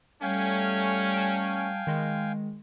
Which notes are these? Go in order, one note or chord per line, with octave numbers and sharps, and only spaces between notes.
G3 A3 C#4 F5 G5 G#5
A5 D7
D#3 G#3